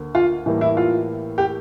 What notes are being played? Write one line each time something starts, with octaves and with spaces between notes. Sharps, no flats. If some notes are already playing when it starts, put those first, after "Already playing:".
Already playing: D2 A#3
F4
A2 E3 G3 A#3
E4
F4
G4